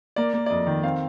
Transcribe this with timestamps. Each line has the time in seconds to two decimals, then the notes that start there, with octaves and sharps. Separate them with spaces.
0.16 A#3 D5
0.34 A#3
0.46 D5
0.50 F2 D#5
0.67 D#3
0.83 C4 F5